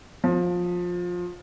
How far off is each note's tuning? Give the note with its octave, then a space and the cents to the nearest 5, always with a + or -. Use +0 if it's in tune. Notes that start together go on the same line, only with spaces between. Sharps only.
F3 +20